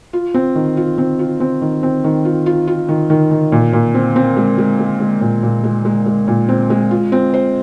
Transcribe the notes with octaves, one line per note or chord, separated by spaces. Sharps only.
F4
C4
D#3
F4
C4
F4
C4
D#3
C4
D#3
F4
F4
F4
D#3
D#3
D#3
A#2
A#2
C4
C4
G#3
G#3
G#3
G#3
A#2
A#2
G#3
G#3
G#3
A#2
C4
G#3
F4
C4
C5